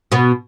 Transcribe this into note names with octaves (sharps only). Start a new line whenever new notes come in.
B2 B3